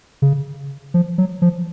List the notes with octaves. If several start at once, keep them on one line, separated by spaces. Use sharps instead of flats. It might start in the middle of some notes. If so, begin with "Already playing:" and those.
C#3
F3
F#3
F3